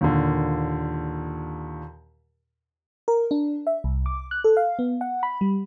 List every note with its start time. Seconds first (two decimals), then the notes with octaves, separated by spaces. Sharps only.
0.01 D#2 A#2 D3
3.08 A#4
3.31 D4
3.67 E5
3.84 C2
4.06 D6
4.31 F#6
4.44 A4
4.57 F5
4.79 B3
5.01 F#5
5.23 B5
5.41 G3